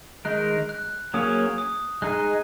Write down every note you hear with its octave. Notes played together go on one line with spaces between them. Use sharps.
D#3 G#3 D#4 A#4 F#6
F#6
F#3 A#3 C#4 G#4 C#5 D#6
D#6
G#3 D#4 G#4 F#6